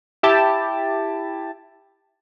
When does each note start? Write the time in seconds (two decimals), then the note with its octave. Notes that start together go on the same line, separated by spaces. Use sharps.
0.23 E4 G4 A5